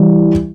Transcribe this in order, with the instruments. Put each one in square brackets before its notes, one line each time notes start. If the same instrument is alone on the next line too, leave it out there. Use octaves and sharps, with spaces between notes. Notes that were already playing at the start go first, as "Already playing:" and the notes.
Already playing: [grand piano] E3 G3